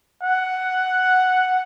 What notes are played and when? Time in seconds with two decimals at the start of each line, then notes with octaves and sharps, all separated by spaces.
0.24 F#5